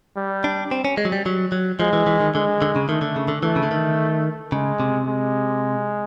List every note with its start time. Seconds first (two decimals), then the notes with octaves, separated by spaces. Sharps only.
0.16 G3
0.44 D4
0.71 C4
0.85 C#4
0.97 G#3
1.05 F#3
1.12 G3
1.26 F#3
1.52 F#3
1.79 F3 G#3
1.93 E3
2.07 E3
2.20 D#3
2.34 D3 G#3
2.62 D3
2.76 C#3
2.89 D#3 A3
3.02 D3
3.16 C#3
3.28 D3
3.43 E3 A3
3.56 C#3
3.63 D3
3.71 D#3
4.52 C#3 G#3
4.80 C3
5.07 G#3